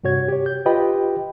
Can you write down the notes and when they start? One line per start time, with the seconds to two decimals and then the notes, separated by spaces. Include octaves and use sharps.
0.04 G2 C3 F#4 C#5 G#6
0.28 G4 C#5
0.46 G6
0.66 F4 G4 B4 D#5 G5 B5